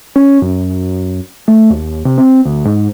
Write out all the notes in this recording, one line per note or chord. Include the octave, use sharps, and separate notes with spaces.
C#4
F#2
A3
D#2
C3
C4
D2
G#2